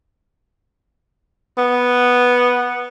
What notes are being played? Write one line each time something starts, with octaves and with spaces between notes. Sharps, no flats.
B3